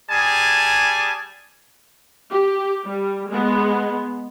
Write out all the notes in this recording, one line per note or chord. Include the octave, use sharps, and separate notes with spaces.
G3 G#4 G#5 A5
G4
G3
G#3 B3